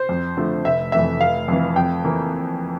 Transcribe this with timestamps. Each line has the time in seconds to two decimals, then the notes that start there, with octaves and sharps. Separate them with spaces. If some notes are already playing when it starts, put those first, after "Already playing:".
Already playing: C5
0.09 F2
0.37 D3 F3 A3
0.65 F1 E5
0.92 F2 E3 A3 E5
1.20 F1 F5
1.48 F2 E3
1.76 F2 G5
2.04 E3 A#3